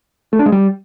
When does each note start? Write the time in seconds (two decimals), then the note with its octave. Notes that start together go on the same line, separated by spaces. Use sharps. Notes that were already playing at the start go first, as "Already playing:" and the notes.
0.33 A3
0.39 D4
0.46 G#3
0.52 G3